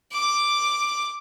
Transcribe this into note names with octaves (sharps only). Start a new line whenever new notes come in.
D6